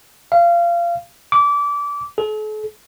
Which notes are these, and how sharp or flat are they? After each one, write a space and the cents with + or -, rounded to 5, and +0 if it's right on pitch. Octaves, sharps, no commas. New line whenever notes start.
F5 -25
D6 -25
A4 -45